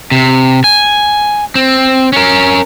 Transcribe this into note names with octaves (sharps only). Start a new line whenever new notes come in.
C3
G#5
C4
C#4 A#4